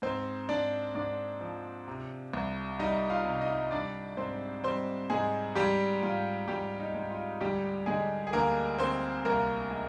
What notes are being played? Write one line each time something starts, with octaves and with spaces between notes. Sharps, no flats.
G#2 C4 C5
G#2 D4 D5
G#2 D4 D5
F3
C3
C2
G3 D#4 D#5
F4 F5
C3
D#4 D#5
G3 D4 D5
G#2 C4 C5
G3 C4 C5
G#2 G#3 G#4
G#2 G3 G4
G#2 F4
G#2 G3 G4
D#4
G#2
F4
D2 G3 G4
D3 G#3 G#4
G#4
D2 A#3 A#4
D2 C4 C5
C2 A#3 A#4
G#3